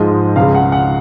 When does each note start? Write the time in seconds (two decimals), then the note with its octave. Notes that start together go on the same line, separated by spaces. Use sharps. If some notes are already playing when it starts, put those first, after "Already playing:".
Already playing: G#2 F3 G#3 D#5
0.36 C#2 C#3 G#3 F5
0.55 F#5
0.72 F#5